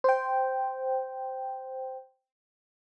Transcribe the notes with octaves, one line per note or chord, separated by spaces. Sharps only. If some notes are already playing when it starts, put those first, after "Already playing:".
C5 G5